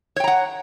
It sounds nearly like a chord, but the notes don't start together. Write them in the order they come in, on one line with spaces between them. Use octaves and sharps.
C#5 G5 A#5 F#5